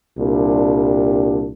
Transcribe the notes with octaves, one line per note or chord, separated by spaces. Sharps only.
C2 A#2 G3 D4